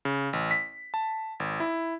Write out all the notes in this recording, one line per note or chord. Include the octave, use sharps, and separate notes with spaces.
C#3
A1
B6
A5
G#1
E4